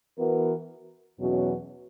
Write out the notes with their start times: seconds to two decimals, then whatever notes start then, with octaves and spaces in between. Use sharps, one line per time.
0.17 E3 B3 F#4 A#4
1.19 E2 B2 F#3 C#4 F#4